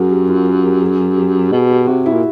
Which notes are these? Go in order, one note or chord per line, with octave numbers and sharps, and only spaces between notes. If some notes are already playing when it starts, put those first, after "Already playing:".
Already playing: F#2 F#4 G#4 A#4
G4
F4
G4
G#4
G4
B2 G#4
G4
C3 F#4
E4
A#2